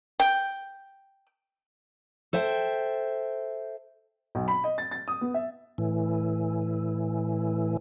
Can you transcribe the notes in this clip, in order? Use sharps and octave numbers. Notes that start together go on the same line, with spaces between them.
G5
A4 C5 E5 G5
B1
B5
D#5
A6
A6
D#6
B3
E5
A2 E3